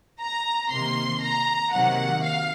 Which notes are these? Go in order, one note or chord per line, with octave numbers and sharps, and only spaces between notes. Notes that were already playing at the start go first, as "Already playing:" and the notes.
A#5
C3 D#3 A#3 C6
A#5
C3 D#3 F#3 A#3 F#5
F5